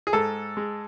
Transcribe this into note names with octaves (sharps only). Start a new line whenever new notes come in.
G#4
G#2 A4
G#3